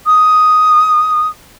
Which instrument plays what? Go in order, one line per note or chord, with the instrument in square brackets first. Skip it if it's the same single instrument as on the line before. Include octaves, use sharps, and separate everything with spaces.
[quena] D#6